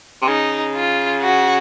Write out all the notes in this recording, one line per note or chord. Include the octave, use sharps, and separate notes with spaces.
C3
C#3 D#4
F4
F#4